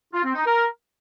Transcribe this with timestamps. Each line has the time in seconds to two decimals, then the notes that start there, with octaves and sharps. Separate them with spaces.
0.13 F4
0.24 C4
0.35 D#4
0.46 A#4